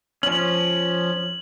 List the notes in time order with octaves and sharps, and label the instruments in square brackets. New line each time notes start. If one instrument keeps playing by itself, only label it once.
[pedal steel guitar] F3 C#4 [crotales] F#7